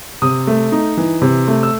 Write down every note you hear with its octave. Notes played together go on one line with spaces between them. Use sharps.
C3 D#6
A3
D#4
E3
C3
A3
E6